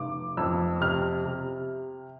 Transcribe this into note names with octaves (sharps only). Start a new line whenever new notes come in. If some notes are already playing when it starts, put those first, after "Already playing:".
Already playing: F1 D6
F2 E6
C3 F6
C3